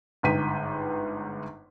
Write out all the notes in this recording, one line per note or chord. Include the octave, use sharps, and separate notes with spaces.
G1 G#2 B4 G5 B6 D#7